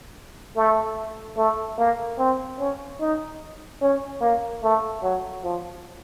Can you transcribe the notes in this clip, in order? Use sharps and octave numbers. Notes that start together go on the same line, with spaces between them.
A3
A3
A#3
C4
C#4
D#4
C#4
A#3
A3
F#3
F3